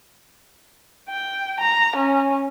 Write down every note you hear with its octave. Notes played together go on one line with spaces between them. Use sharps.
G5
A#5
C#4